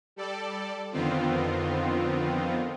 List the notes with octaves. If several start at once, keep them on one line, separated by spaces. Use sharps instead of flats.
G3 A4 D5
F2 D3 D#3 B3 C4 F4